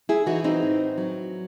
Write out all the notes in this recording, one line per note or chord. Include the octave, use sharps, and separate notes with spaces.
E4 G#4
E3 D#4 F#4
C4 D#4
A2
F#3